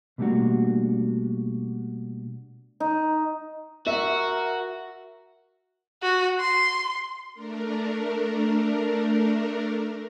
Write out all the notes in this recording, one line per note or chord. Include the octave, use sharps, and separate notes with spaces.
B2 G3 A3 A#3 D4 F#4
D#4
F#4 A#4 E5
F#4
C6
A3 D4 A#4